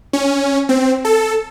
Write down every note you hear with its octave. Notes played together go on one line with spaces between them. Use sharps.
C#4
C4
A4